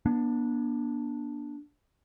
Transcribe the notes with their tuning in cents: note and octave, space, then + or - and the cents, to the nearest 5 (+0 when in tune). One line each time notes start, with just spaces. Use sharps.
B3 -45 D4 +0